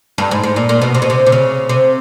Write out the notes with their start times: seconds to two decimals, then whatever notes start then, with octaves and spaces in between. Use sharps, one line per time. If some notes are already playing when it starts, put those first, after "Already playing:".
0.18 G2
0.31 G#2
0.43 G#2
0.56 A#2
0.69 A#2
0.82 B2
0.94 C3
1.02 B2
1.10 C3
1.26 C3
1.32 C#3
1.69 C3